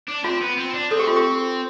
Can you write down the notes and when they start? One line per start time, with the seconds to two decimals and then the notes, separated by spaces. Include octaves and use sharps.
0.08 D4
0.24 C4 F4
0.42 B3
0.58 C4
0.74 D4
0.91 C4 A4
0.99 G4
1.07 F4
1.16 G4